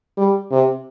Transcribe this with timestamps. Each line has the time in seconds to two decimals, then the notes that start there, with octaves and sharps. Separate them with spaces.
0.17 G3
0.51 C3